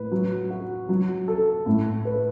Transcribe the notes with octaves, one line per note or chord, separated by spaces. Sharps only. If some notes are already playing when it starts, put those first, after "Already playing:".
Already playing: A2 B4
F#3
F#4
F#3
A4
A2
B4